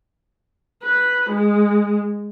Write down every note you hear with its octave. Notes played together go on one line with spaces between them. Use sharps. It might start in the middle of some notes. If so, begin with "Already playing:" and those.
B4
G#3